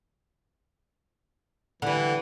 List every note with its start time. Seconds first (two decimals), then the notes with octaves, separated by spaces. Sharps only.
1.82 D3 E3 G3